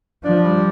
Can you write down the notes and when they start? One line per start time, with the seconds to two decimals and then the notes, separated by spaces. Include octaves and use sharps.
0.24 F3 D4
0.43 G3